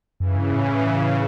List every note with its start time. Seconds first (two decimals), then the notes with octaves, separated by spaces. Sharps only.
0.20 F#2 C#3 E3
0.36 G2
0.54 A2
0.87 C#3